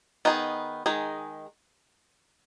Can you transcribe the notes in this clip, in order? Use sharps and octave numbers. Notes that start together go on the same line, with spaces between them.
D#3 B3 D#4 G#4
D#3 G#3 D#4 G#4